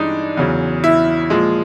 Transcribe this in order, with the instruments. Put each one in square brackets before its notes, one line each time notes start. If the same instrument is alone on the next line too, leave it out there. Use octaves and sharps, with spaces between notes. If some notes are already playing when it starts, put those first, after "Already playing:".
Already playing: [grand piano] G2 E3 G#3 D4 D#4
E2 C#3 F#3
E4
A#2 F3 G#3